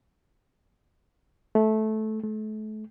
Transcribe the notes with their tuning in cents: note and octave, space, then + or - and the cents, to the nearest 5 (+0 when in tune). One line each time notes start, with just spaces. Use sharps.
A3 -15
A3 -35